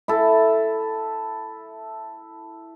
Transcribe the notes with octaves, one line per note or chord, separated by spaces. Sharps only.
E4 A4